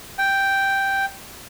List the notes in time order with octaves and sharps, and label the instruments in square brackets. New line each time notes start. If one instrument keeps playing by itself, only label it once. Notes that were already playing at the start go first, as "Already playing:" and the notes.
[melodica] G5